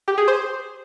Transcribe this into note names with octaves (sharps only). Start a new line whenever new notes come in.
G4
G#4
C5